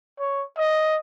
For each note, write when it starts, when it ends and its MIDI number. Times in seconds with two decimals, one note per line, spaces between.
0.19 0.44 73
0.57 0.97 75